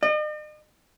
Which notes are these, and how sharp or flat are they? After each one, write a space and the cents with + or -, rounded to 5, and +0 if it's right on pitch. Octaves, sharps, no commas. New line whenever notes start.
D#5 -45